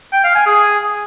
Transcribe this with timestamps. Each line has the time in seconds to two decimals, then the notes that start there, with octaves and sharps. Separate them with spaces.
0.13 G5
0.24 F5
0.35 G#5
0.46 G#4